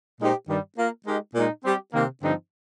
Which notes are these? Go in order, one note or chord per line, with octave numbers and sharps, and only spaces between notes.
A#2 G#3 D#4 G4 C5
G2 D#3 G3
A#3 F4 A#4
G#3 D#4 G4 A#4 D#5
A#2 G#3 D#4
G3 C4 G4
C3 D#3 A#3
G2 D3 F3 C4 D#4